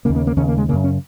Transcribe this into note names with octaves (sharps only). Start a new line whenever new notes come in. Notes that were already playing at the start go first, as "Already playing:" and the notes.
D#2 C#3 A#3
A#3
A#3
D#2 C#3 C#4
A#3
G#3
F#2 C#3 A#3
C#4